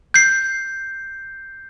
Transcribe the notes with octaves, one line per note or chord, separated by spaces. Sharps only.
G6 C7